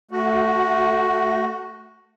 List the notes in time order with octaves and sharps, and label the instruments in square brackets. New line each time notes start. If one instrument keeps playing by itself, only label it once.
[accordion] A3 F#4